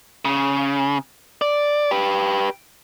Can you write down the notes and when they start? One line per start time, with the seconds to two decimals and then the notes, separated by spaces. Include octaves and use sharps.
0.25 C#3
1.42 D5
1.91 G4 B4